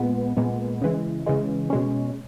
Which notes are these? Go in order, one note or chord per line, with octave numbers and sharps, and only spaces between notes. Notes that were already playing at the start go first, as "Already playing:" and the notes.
Already playing: A#2 G#3 B3
A#2 G#3 B3
C#3 E3 G#3
C#3 E3 G#3
B2 G#3 C#4